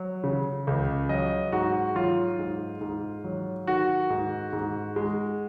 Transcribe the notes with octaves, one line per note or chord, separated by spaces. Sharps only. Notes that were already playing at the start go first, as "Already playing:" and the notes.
Already playing: F#3
C#3
C#2
F#3 D#5
G#2 F#4
F#3 F4
G#2
G#2
F#3
D#3 F#4
G#2
G#2
G#3